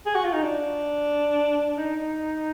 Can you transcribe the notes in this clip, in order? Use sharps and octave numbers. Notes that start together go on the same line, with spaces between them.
G#4
F#4
F4
D#4
D4
D#4